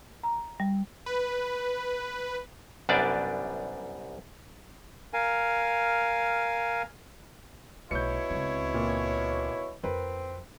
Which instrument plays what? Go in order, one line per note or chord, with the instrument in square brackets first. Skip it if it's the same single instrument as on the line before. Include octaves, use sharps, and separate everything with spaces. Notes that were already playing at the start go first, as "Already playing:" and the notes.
[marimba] A#5
G3
[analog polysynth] B4
[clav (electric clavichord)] C2 F#2 G3 B3 D4 D5
[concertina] A#4 F5 G#5
[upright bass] B1 A3 [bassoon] B2 [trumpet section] E4 C#5 [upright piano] G6 C#7
[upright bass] C#2 C4
[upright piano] A#2
[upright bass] F2 [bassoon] C4 [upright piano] A#4 B4